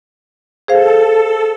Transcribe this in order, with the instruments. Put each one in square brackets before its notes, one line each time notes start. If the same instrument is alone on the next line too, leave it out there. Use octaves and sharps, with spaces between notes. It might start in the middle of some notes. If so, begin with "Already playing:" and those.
[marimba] G#4 C5 F5 [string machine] A4